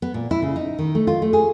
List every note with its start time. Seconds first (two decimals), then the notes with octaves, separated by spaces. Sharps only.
0.02 B3
0.14 A#2
0.31 E4
0.42 C#3
0.56 D#4
0.79 D#3
0.95 A3
1.07 F4
1.22 A3
1.33 G#4